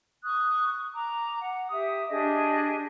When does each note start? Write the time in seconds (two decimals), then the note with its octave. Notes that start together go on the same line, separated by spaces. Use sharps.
0.23 C#6 D#6 F#6
0.93 A#5 D6
1.39 F#5
1.69 G4 E5 D#6
2.10 D4 G4 G#4 D#5